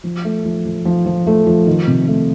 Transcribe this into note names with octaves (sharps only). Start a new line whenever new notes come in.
F3
A3
F3
F3
F3
F3
A3
F3
D#3
C3
A3